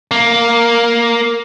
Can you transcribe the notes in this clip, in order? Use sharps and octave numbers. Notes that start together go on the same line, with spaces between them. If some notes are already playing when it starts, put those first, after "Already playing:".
A#3